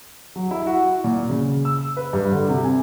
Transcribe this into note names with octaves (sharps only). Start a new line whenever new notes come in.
F#3
E4
F#4
A#2
C#3
E6
B4
G2
D3
C3
G#5